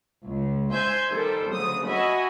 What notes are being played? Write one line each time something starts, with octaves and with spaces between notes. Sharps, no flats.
C#2
C5 E5 G#5 G6 G#6
D#3 G3 A4 C5
D2 C#3 F#3 D#6
F#4 D#5 E5 G#5 B5